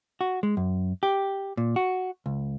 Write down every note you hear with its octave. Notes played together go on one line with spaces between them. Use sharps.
F#4
G#3
F#2
G4
A#2
F#4
C#2